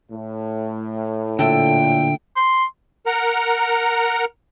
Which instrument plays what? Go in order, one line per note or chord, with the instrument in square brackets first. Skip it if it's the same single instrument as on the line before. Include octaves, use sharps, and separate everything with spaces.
[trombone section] A2
[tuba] A#2 [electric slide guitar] D3 A4 E5 [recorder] G5
[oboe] C6
[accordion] A#4 F#5 A#5